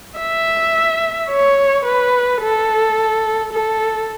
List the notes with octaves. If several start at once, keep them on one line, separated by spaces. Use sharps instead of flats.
E5
C#5
B4
A4
A4